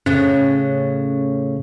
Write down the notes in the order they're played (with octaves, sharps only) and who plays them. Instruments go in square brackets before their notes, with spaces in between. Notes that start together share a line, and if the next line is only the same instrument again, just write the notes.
[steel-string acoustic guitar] A2 C#3 [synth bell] C#4